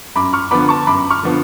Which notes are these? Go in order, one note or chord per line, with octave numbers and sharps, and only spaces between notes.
F#2 B5 D6
C#6 F6
D3 F3 B3 B5 D6
A5 C#6
F#2 B5 D6
C#6 F6
D3 F3 B3